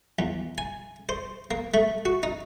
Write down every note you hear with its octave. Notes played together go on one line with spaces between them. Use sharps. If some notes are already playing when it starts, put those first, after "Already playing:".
E2
G#5
C5
A#3
A3
F#4
D#4